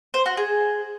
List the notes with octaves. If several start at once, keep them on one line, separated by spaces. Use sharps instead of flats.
C5
F#4
G#4